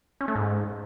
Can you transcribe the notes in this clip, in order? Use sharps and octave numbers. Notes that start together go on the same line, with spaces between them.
C#4
A3
G#2